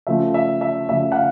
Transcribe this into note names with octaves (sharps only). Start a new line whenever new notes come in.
C#3 F3 A3 E5
E5
E5
C#3 F3 A3 E5
F#5
F5